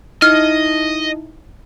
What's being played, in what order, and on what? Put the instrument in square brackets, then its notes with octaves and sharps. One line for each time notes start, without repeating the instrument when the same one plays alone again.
[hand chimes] D#4 E4 [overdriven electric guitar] D#5 [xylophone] F6